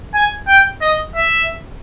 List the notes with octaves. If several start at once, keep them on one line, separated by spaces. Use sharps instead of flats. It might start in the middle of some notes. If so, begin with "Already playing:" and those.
G#5
G5
D#5
E5